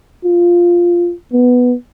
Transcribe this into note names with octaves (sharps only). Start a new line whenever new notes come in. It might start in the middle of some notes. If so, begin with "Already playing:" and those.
F4
B3